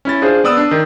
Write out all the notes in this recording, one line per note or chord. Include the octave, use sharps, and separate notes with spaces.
C#4 E4 A6
D4 F4 G#4 C5
B3 D5 D#6 E6
D4
D#3